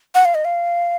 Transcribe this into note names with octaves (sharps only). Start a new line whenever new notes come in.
F#5
F5
D#5
F5